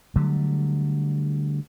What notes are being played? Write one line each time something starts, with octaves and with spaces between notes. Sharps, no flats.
D3 F#3 G3 A3